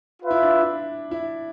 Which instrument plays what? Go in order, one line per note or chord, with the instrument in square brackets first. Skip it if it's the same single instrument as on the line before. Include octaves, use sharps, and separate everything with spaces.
[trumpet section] F4 B4 E5
[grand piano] E4
D4
E4
E4